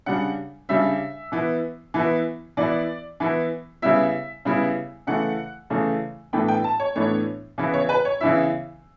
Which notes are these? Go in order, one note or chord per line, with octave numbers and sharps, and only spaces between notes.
C#3 G3 D4 F#5
C#3 G3 D4 E5
E3 B3 E4
E3 B3 E4
E3 B3 E4 D5
E3 B3 E4
C#3 G3 B3 E4 E5
C#3 G3 B3 E4
C#3 E3 A3 F#5
C#3 E3 A3
A2 E3 B3 D4 G5
G5
A5
C#5
A2 E3 B3 D4 C#5
C#3 E3 B3 E4
C#5
B4
C#5
C#3 E3 B3 E4 E5